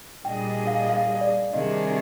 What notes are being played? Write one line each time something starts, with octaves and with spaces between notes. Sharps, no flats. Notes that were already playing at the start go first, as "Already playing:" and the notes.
A#2 G3 D4 G#4 D#5 G5
F5
F5
D5
C3 D#3 G3 D4 G#4 D#5